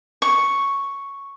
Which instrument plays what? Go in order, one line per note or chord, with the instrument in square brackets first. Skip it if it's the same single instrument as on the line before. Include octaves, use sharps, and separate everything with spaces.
[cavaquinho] C#6